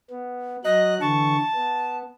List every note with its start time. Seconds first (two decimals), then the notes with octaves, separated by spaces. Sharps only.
0.10 B3
0.64 F#3 D#5 F#6
1.01 D3 E3 A5 C#6
1.55 B3